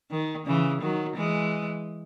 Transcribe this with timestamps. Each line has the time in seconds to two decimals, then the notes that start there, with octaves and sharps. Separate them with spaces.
0.11 D#3
0.46 C#3 E3
0.81 D#3 F#3
1.16 E3 G#3